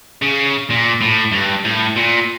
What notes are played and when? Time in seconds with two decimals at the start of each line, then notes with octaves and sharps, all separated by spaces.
0.22 C#3
0.70 A#2
1.01 A2
1.32 G2
1.65 A2
1.96 A#2